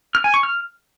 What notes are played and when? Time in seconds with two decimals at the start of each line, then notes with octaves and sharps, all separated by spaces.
0.15 F6
0.24 G#5
0.34 C#6
0.43 F6